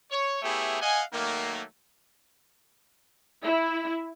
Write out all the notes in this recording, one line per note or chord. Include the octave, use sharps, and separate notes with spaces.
C#5
A3 B3 E4 G4 G#4 C#5
D#5 F5 F#5 G#5
D#3 F#3 A3 A#3
E4